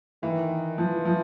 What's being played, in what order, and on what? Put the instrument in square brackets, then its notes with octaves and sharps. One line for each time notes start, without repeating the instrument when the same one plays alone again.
[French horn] D#3 [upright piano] E3
[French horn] E3 [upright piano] F3
[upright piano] F3